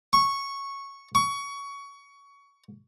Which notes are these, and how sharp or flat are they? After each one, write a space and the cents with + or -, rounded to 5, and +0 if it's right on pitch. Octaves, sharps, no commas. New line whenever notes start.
C#6 -5
C#6 +20